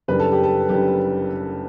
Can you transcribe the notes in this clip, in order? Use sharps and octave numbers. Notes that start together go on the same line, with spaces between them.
F#1 F#2 D3 G3 B4
A4
G4
A4
F#1 F#2 D3 G3 G4